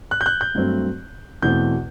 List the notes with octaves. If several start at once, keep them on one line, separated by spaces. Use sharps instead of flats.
F#6
G6
F#6
G6
G2 F#3 A3 C4
E2 B2 A3 C4 G6